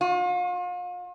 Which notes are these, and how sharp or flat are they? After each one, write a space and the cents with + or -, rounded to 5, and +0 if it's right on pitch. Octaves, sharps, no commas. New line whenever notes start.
F4 +40